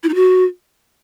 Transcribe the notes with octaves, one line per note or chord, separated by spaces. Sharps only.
E4
D#4
F#4